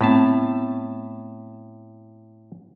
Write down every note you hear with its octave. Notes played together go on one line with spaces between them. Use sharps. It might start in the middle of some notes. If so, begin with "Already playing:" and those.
A2 A3 B3 C4 A5